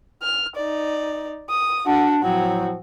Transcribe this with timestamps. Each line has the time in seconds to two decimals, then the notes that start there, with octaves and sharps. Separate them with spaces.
0.22 F6
0.56 D#4 D5
1.49 D#6
1.86 D4 F#4 F#5
2.23 A2 F3 F#3 C4 F#4